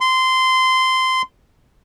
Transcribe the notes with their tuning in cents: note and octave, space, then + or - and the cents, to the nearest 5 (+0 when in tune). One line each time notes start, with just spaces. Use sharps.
C6 -15